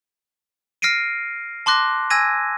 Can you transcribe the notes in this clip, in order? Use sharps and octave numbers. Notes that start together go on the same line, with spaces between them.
F6 A#6 C7 D7 D#7
A5 C6 D6 F#6 A#6
G#5 E6 G#6 A#6 D#7